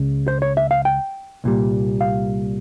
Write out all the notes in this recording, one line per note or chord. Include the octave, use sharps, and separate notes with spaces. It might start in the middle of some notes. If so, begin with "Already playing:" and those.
Already playing: C#2 C#3
C5
C#5
E5
F5
G5
C2 A#2 G3
F5